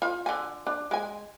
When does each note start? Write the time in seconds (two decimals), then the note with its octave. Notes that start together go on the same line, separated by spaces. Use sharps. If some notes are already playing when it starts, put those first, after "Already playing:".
0.02 F4 F5
0.26 D3 G#5
0.67 D4
0.91 G#3 G#5